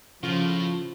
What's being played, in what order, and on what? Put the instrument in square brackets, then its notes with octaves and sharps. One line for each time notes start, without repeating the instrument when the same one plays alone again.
[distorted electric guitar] A2 [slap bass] C#3 [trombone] F3 [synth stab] F4